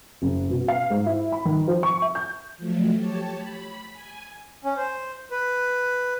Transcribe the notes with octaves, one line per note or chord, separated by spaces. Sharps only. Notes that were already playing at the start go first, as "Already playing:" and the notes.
F#1
B2
F5
G#2
E4
B5
D#3
F3
C#6
E5
G6
F3 F#3 A3
G4 C#5 A5
B5
G#5
C#4
C5
B4